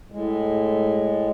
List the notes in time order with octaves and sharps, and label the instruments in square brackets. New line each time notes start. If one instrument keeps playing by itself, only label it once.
[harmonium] A2 G#3